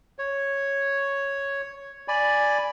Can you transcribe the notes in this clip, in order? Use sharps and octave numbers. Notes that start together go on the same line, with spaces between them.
C#5
D5 G#5 B5